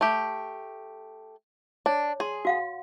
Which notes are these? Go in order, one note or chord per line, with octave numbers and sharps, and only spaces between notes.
A3 G4
D4 C#5
G#4 C6
F#4 F5 F#5